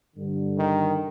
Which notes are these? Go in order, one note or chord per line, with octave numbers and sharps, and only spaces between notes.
G2 D3
D#3